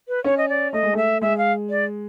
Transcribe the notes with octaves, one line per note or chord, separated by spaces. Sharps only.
B4
C#4 C#5
D#5
D5
A3 D#5
G#3
A3 E5
G#3 E5
F5
D5